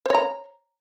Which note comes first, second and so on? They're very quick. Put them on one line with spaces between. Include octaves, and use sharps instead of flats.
C5 C#5 A#5